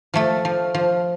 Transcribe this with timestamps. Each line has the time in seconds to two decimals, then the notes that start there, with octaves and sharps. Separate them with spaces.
0.14 F3 A3 A4
0.45 F3
0.74 F3